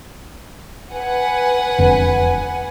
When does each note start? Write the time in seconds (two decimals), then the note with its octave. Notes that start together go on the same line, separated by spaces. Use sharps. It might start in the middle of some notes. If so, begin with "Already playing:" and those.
0.93 B4 F#5 G#5
1.79 E1 F2 D3